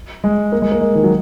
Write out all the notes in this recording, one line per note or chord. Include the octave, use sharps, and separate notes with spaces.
G#3
A#3
G#3
A#3
G#3
D#3
F#3